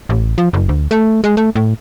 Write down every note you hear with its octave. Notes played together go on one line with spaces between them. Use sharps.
A1
F3
F#1
D2
A3
G#3
A3
A2